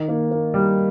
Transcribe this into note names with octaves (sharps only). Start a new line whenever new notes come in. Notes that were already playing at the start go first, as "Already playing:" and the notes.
Already playing: D#3
A#3
A#3
G3